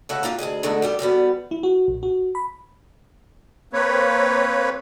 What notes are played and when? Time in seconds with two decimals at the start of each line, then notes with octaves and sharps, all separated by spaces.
0.09 C#3 G#3 A3 A4 E5 F#5
0.23 A#3 C4 F4 G4
0.39 D2 G#2 G#4 D#5
0.63 D3 G#3 A3 B3 D#4
0.82 G3 B3 G4
0.99 E2 B2 G3 B3
1.51 E4
1.63 F#4
1.88 A#1
2.03 F#4
2.35 B5
3.73 A#3 C4 B4 C#5